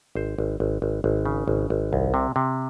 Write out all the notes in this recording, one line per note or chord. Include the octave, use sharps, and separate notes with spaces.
G#1 C5
G#1
G#1
G#1
G#1
C#3
G#1
G#1
C2
C3
C3